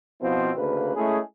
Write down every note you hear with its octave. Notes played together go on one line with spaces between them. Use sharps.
B2 F3 B3 C4 E4 F4
D2 C#3 A#3 B4
G#3 A3 C#4 E4 G#4